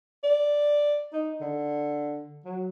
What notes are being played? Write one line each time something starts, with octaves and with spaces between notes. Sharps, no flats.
D5
D#4
D3
F#3